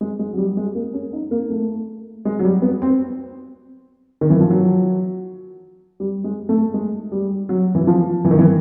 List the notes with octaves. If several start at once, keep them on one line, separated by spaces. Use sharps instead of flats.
G#3
G#3
F#3
G3
G#3
A#3
C#4
D#4
A#3
A3
G#3
F#3
G3
B3
C4
D#3
E3
F3
F#3
G3
G#3
A3
G#3
G3
F#3
E3
F3
E3
D#3
E3